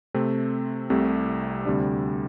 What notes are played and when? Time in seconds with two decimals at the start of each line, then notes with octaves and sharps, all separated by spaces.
0.14 C3 A3 C4
0.90 C2 C3 A3
1.65 D2 C3 G3 D4